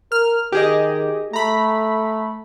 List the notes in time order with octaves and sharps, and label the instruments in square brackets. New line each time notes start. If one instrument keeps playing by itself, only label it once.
[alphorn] A#4 [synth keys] F6
[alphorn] D#3 [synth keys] G4 G#4 D#5
[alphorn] A3 [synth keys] A#5 B5